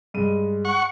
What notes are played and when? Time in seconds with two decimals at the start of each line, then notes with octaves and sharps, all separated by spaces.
0.14 G2 G#3 D#7
0.65 F#5 C#6